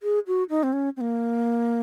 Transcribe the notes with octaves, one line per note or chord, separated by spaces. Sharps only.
G#4
F#4
D#4
C4
C#4
C4
A#3